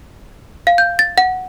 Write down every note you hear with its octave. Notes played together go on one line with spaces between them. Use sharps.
F5
G6
A6
F#5